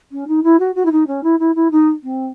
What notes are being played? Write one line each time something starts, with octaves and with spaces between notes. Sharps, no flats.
C#4
D#4
E4
F#4
F#4
E4
D#4
C#4
E4
E4
E4
D#4
C4